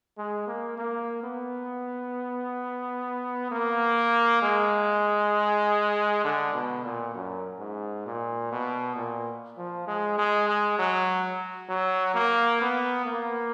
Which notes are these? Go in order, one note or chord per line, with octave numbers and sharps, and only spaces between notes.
G#3
A#3
A#3
B3
A#3
G#3
D3
B2
A#2
F#2
G#2
A#2
B2
A#2
F3
G#3
G#3
G#3
F#3
F#3
A#3
B3
A#3